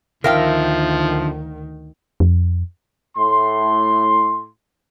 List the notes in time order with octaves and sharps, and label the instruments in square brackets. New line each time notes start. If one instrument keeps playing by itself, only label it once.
[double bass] D2 D#3 [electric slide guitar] D3 E5 [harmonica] F3 [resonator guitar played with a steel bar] A#4 F5 G5
[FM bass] F2
[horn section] A2 C6